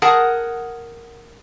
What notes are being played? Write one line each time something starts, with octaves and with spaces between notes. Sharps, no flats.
G#4 A#4 F#5 A5